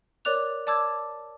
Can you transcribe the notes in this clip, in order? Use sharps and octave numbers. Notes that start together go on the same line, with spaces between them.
A#4 C#5 D5 D6 F#6 F7
D5 A5 D6 E6 G#6